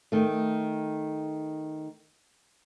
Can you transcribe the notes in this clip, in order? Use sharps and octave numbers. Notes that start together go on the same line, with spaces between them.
D#3 A3